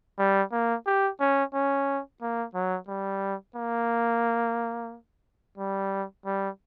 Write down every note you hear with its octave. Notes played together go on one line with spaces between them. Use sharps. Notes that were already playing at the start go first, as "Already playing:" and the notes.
G3
A#3
G4
C#4
C#4
A#3
F#3
G3
A#3
G3
G3